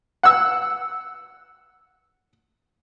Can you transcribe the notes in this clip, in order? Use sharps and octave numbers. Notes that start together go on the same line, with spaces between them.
F#5 E6